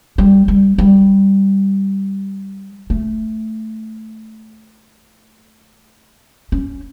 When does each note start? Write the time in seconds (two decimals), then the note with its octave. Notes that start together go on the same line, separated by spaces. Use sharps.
0.18 G3
0.48 G3
0.78 G3
2.90 A3
6.52 C#4